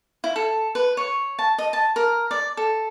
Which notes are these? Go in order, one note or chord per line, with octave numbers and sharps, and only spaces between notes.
E4
A4
B4
C#5
A5
D#5
A5
A#4
D5
A4